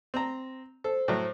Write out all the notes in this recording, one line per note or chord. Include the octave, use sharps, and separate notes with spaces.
C4 A#5
A4 C5
A2 F#3